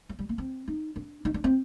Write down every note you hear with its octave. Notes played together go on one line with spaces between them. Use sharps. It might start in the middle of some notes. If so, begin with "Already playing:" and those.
F#3
G3
A#3
C4
D#4
D4
D#4
D4
C4